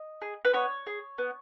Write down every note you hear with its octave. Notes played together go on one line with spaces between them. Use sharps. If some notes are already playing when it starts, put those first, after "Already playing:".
Already playing: D#5
G#4
B4
B3 C#5
G#4
B3